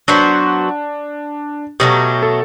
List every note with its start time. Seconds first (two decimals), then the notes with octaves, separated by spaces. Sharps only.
0.08 F#3 B3 D4 F#4 C5
1.80 B2 F#3 A3 G4
2.23 A4